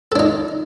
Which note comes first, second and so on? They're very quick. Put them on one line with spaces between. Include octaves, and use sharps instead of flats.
A4 D4 D#4